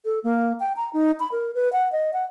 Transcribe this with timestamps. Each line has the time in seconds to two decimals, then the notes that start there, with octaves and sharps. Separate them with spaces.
0.05 A4
0.24 A#3
0.60 G5
0.76 A#5
0.93 D#4
1.20 B5
1.32 A#4
1.55 B4
1.73 F#5
1.92 D#5
2.13 F#5